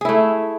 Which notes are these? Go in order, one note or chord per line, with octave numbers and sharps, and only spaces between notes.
A3 E4 G#4